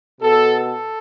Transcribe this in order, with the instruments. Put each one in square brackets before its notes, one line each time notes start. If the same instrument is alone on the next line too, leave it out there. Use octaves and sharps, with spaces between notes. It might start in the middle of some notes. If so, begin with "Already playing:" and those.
[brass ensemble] B2 B3 A4
A4